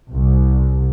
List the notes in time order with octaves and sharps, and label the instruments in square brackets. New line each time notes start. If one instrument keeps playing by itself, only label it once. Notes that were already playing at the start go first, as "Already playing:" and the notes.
[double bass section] C2